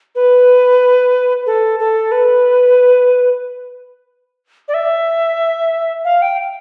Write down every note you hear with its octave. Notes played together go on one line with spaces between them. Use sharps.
B4
A4
A4
B4
D5
E5
F5
G5